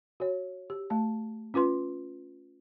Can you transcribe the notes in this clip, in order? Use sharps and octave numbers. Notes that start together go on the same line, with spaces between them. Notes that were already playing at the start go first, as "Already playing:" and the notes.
F#4 C#5
G4
A3 A5
C#4 F4 B4 C6